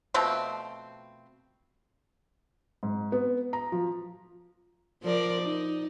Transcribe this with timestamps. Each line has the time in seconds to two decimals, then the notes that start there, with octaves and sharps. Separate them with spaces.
0.14 B2 F3 A3 C4
2.83 G#2
3.12 B3
3.53 A#5
3.72 F3
5.03 F3 A#4 D5
5.42 D#4